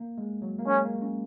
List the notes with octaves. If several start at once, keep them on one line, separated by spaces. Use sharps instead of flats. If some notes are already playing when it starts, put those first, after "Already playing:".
Already playing: A#3
G#3
F#3
A#3
G#3 C#4
A#3
C#4